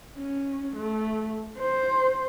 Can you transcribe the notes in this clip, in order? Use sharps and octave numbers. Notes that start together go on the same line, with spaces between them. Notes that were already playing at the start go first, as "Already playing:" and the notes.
C#4
A3
C5